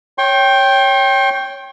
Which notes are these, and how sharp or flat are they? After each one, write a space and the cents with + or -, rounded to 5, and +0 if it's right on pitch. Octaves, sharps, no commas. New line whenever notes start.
C#5 +0 G5 +0 C6 +45